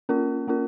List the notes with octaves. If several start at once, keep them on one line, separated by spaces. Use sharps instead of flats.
A#3 C#4 F4 A#4
A#3 C#4 F4 A#4